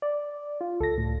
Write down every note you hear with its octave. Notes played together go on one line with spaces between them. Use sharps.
D5
F4
C#2 A4 A#6
A2